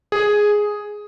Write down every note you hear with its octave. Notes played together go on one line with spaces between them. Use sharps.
G#4